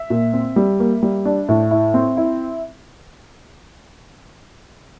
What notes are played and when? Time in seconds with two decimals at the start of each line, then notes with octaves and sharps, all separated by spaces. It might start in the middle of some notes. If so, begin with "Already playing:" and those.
Already playing: E5
0.10 A#2
0.33 C4
0.56 G3
0.80 A#3
1.03 G3
1.25 D4
1.49 A2
1.71 E4
1.94 C4
2.17 E4